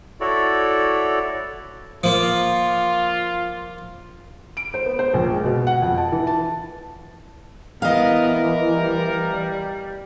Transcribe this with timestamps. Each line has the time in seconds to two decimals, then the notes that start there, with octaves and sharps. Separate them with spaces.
0.21 E4 F#4 A4 C#5 D5
2.03 F3 A#3 F4
4.57 D7
4.74 C5
4.86 B3
4.99 C5
5.14 A#1
5.31 G#3
5.45 B2
5.67 F#5
5.82 F2
5.98 A5
6.12 E3
6.27 A5
7.82 E3 B3 A#4 D#5 F5
8.72 G3